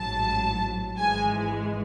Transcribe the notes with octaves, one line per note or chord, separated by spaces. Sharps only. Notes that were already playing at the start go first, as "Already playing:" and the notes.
Already playing: A1 G#2 F#3 A5
G#1 G#2 E3 G#3 G#5